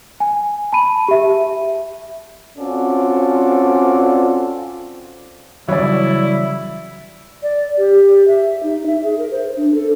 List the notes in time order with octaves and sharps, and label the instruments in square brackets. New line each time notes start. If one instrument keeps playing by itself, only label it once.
[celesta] G#5
A5 B5 D#7
G4 E5
[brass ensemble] C4 C#4 F4 F#4 A4 D5
[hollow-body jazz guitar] C#3 E3 F#3 [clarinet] G3 [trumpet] E4 [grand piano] C#5 D5
[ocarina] D5
G4
E5
D#4
E5
G#4
A#4
C5
D4
A4